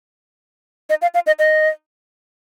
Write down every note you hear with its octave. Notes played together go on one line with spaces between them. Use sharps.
D#5
F5
F5
D#5
D#5